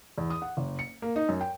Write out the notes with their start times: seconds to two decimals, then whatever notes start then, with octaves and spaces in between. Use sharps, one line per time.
0.18 E2
0.30 D#6
0.42 F#5
0.57 F#1
0.79 C#7
1.02 A#3
1.16 D#4
1.29 F#2
1.41 G5